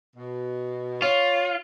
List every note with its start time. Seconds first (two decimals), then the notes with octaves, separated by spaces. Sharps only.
0.16 B2
1.02 F4 C#5